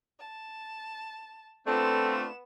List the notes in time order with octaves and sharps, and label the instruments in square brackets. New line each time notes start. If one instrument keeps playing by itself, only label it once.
[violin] A5
[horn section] A3 D4 F4 [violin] B3 E7 [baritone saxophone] C4 [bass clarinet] A4